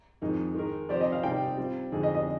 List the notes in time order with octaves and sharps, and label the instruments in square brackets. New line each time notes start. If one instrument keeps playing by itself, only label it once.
[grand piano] F2 D#3 G#3 D#4 G#4
D#3 G#3 D#4 A#4
[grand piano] F3 C4 G4 C5 [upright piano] D5
[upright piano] D#5
F5
[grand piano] C3 G3 C4 D#4 [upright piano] G5
[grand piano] G3 C4 F4
F2 D3 G#3 D#4 G#4
[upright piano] D#5
D#5